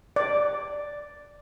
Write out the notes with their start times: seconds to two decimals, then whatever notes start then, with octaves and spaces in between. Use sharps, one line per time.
0.16 D5